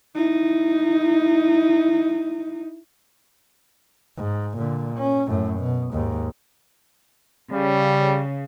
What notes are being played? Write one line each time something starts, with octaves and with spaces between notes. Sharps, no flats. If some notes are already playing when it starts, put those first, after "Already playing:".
D#4 E4
G#2
A#2 D3
C#4
F#2 A2
B2
D#2 G#2
C#3 G3